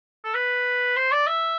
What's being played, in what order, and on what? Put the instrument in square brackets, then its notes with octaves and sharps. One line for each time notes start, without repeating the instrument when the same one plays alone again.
[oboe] A4
B4
C5
D5
E5